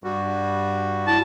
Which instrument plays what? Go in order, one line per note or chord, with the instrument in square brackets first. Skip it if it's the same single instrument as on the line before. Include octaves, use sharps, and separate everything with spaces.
[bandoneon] G2 G3 F#4
[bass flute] E4 [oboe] A5